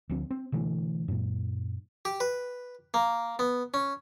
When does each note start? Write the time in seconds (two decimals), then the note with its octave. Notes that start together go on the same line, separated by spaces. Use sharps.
0.10 D2 F3 C4
0.30 C4
0.52 B2 D3 E3 A3
1.08 F#2 A#2
2.05 G4
2.20 B4
2.94 A#3
3.39 B3
3.74 C#4